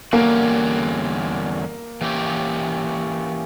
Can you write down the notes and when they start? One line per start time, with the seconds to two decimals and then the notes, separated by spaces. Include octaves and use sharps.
0.13 E2 D3 G3 A#3 C#4 F#4
2.01 E3 A#3 C#4 G4